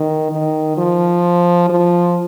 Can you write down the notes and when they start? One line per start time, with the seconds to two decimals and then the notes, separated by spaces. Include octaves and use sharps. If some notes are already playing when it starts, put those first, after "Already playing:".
Already playing: D#3
0.31 D#3
0.77 F3
1.70 F3